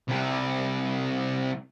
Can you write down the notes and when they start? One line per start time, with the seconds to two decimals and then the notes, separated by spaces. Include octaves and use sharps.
0.09 C2 C3